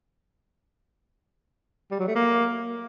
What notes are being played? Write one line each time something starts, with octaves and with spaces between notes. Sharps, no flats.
G3
F#3
A3
A#3